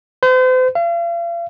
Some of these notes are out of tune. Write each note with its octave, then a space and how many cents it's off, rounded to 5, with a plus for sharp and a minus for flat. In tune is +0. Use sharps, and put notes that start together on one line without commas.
C5 -40
F5 -40